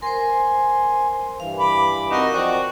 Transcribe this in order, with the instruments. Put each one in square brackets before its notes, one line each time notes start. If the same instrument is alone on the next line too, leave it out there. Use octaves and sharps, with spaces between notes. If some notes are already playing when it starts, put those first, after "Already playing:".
[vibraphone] A#4 C5 [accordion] G#5 C6
[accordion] G2 E3 [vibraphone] F5
[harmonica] B5 D6
[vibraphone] C4 A#4 [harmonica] D#4 F#4
[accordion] F3 [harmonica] F#4 D5 [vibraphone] C5 D#5 G5